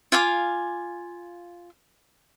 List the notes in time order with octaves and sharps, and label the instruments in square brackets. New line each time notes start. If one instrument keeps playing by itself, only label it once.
[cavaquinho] F4 F5 G#5 D6